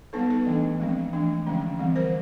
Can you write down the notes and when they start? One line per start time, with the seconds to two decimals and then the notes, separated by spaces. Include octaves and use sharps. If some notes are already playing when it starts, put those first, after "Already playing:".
0.13 G3 B3 D#4 A4 B4
0.30 A4 B4
0.47 E3 A3 D4
0.80 F3 G#3 C4
1.13 E3 A3 D4
1.47 D3 F3 G#3 C#4
1.79 E3 G3 C4
1.96 A#4 C5